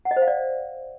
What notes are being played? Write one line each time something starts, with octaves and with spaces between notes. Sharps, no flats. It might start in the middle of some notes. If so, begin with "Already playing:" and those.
F#5
D#5
C5
F5
D5